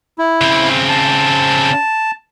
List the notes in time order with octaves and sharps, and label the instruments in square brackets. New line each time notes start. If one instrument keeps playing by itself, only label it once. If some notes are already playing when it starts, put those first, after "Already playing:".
[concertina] E4
[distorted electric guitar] C#3 C4
[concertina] A5